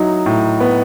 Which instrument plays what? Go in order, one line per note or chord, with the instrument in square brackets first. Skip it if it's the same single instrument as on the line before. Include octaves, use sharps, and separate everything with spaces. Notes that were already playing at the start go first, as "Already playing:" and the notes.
Already playing: [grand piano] F#3 E4 [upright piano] D#4
[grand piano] A2
B3